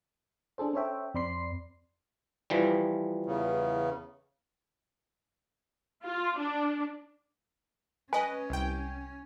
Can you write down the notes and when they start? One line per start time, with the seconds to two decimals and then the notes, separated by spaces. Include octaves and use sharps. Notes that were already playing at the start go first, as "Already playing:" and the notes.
0.58 D4 G#4 A4 C5
0.73 C#4 A4 C5 C#5 E5 G5
1.14 F2 C4 D5 B5 C6 C7
2.50 E3 F3 G3
3.26 E2 C#3
6.04 F4
6.38 D4
8.13 C#4 B4 D#5 G#5
8.50 C2 G5